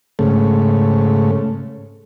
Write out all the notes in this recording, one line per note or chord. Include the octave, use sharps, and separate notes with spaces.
G#2 C#3 A3